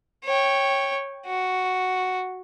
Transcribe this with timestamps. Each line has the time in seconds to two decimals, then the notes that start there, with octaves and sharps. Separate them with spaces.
0.24 C#5 G5
1.26 F#4